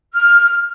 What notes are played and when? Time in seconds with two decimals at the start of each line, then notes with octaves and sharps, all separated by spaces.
0.13 F6